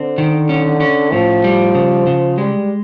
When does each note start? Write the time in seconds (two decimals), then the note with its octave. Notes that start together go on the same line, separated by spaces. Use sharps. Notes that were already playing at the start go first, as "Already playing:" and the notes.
Already playing: D3 C4
0.18 D#3
0.49 C#4
0.80 C#4
1.12 A2 F3
1.44 G3
1.75 C#3
2.07 C#3
2.38 G3 G#3